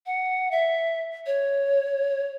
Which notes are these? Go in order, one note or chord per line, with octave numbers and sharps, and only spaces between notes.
F#5
E5
C#5